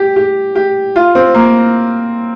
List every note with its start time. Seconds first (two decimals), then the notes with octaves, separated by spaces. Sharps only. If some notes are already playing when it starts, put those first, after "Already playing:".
Already playing: G4
0.16 G4
0.55 G4
0.96 F4
1.15 C4
1.34 A#3